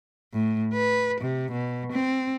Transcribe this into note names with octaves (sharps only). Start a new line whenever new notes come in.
A2
B4
C3
B2
C4